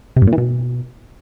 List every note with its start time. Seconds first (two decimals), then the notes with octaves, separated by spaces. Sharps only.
0.16 C3
0.22 G2
0.27 A#2
0.32 E3
0.38 B2